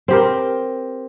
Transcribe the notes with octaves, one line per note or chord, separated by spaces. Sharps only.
C4 G4 A#4